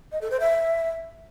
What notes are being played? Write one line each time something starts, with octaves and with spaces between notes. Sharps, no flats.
D#5
A4
C5
E5